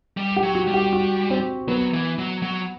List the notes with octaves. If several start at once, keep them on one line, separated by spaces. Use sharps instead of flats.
G3
G4
F#3
F#4
G3
G4
F#4
C4
F#3 B3
E3
F#3
F#3